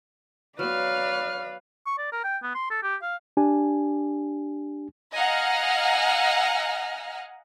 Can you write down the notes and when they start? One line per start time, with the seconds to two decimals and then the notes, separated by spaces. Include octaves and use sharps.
0.59 F#3 B3 B4 D5 F5 F6
1.86 C#6
1.98 D5
2.12 A#4
2.24 G5
2.43 B3
2.55 C6
2.70 A4
2.83 G4
3.03 F5
3.37 D4 G4 G#5
5.13 D#5 F5 F#5 G#5 A#5 F6